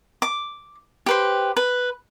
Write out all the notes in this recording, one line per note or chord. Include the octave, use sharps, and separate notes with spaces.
D6
G4 B4 C5
B4